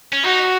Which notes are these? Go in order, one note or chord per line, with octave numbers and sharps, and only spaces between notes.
C#4
D#4 F#4